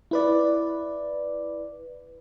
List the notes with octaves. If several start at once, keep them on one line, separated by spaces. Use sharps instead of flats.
E4 B4 D5